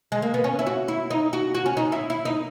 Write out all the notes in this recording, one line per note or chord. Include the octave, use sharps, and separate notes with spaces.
G#3
A#3
B3
C#4
E4
F#4
E4
D#4
F#4
F#4
C#4
D#4
E4
E4
D#4